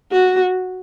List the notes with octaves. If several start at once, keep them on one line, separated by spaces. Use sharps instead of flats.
F#4